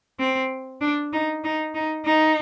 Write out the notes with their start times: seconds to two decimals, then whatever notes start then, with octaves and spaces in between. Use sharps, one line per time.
0.19 C4
0.81 D4
1.13 D#4
1.44 D#4
1.74 D#4
2.06 D#4